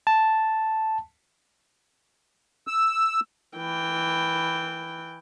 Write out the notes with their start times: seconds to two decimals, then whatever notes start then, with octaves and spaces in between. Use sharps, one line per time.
0.07 A5
2.67 E6
3.57 E3 G5